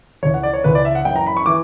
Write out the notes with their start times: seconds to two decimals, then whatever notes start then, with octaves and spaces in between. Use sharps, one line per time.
0.23 C#2 C#3 E3 C#5
0.34 F#5
0.43 D5
0.54 C#5
0.64 C#2 C#3 E3 B4
0.75 D5
0.85 E5
0.95 F#5
1.05 F#2 E3 G5
1.16 A#5
1.26 B5
1.37 C#6
1.46 E3 D6